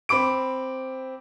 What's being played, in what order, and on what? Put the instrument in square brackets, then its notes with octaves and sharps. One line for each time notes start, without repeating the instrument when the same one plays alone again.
[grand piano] C4 B5 D6 D7